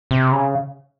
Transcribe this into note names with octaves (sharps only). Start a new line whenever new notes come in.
C3
C#3